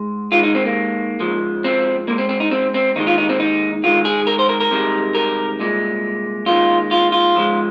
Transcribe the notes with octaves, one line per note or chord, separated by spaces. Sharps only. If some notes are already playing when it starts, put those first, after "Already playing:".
Already playing: G#2 G#3
G#2 D#3 G#3 F4
D#4
C4
A#3
G#2 F3 G#3
C4
G#2 G#3 A#3
C4
C4
D#4
C4
C4
D#2 D#3 G#3 D#4
F4
D#4
C4
D#4
G#2 D#3 G#3 F4
G#4
A#4
C5
A#4
A#4
C2 C3 D#3 G#3
A#4
C2 A#2 G#3
D#2 D#3 G#3 F4
F4
F4
G#2 F3 G#3